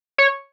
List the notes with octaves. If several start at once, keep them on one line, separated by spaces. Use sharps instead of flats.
C#5